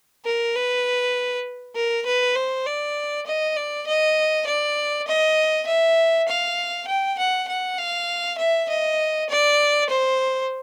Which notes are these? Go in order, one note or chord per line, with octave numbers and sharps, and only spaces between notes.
A#4
B4
A#4
B4
C5
D5
D#5
D5
D#5
D5
D#5
E5
F5
G5
F#5
F#5
F5
E5
D#5
D5
C5